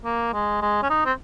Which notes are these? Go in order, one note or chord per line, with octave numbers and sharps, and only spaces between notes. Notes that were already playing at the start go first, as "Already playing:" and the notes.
A#3
G#3
G#3
C#4
D#4
C4